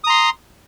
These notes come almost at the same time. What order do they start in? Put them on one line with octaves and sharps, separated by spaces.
D#6 A#5 C6